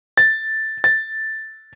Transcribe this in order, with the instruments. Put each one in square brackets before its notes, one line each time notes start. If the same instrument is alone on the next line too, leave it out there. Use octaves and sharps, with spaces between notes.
[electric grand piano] A6
A6